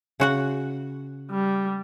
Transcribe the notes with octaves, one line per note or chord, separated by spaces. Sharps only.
C#3 F#4 F#5
G3